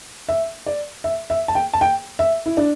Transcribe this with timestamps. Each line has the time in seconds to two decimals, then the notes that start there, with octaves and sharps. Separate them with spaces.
0.29 E5
0.66 D5
1.04 E5
1.30 E5
1.48 A5
1.55 G5
1.73 A5
1.81 G5
2.19 E5
2.46 E4
2.57 D4